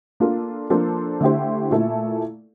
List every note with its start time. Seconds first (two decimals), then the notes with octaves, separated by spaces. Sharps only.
0.20 A#3 D4 F4 A4
0.70 F3 A#3 D4 A4 C5
1.21 D3 A3 E4 G4 C5
1.71 A#2 A3 E4 A4